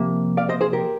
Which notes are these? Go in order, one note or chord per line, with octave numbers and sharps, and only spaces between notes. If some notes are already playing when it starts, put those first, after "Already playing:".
Already playing: C3 F3 A#3
D5 F5
C5 D#5
G#4 C5
G4 A#4